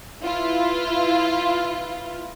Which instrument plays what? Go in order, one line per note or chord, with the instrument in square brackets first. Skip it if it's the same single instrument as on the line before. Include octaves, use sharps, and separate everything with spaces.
[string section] E4 F4 B4